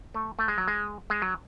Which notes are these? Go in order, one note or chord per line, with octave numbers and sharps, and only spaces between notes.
A3
A3
G#3
F#3
G#3
G#3
F#3